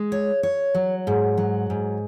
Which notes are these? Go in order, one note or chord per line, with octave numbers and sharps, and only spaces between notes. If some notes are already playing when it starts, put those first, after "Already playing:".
Already playing: G#3
C#5
C#5
F#3
G#2
F#3
G#2